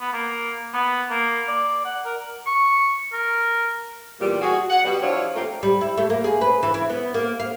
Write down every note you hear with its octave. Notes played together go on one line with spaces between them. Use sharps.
B3
A#3
B3
A#3
D5
F#5
A#4
C#6
A#4
E2 A#2 G3
F#4 G#4
F#5
B2 G3
F3 D4 E4 C#5
G2 A3 A#3 C4 F4 A#4
G3
E4
A3
A#3
G#4
B4
E3
E4
B3
A#3
F5